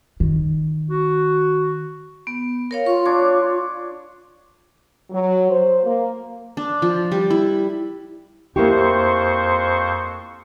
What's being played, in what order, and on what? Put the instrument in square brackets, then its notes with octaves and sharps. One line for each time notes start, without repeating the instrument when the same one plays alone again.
[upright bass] D#3
[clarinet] F#4
[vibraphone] B3
A#4 C#5 F5
[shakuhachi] F4 [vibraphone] C#6
[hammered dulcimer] D4 C#5 [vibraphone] D6
[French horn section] F#3
C5
A#3
[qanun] D4
F3
G3
E4
[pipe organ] F2 C5 C#6 [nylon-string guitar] A#3 E4 G4